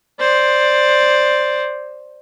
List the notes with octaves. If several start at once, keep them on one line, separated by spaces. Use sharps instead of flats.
C5 D5